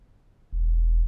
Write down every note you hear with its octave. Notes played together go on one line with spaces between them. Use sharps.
E1